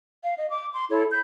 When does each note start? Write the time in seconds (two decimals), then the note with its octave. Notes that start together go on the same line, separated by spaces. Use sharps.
0.23 F5
0.36 D#5
0.50 D6
0.74 C6
0.89 E4 A4 C#5
1.10 B5 G6